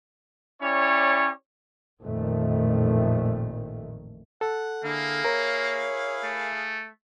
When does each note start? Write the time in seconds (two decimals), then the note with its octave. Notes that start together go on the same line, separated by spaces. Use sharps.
0.62 C#4 E4 G4 C#5 D5
2.03 A1 F2 A#2 D#3 A3
4.41 A4 F#5
4.84 D3 A#3 E4 G#4 F5
5.25 A#4 C#5
6.24 A3